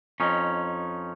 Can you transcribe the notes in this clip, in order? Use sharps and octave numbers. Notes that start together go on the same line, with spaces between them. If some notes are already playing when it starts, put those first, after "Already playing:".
F2 C#4 D#4